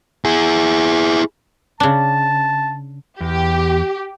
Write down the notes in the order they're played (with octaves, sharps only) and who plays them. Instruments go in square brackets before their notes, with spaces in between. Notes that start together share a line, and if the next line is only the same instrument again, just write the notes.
[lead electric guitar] E4 G#4
[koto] C#3 D4 [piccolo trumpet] A5
[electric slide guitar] E2 [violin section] G4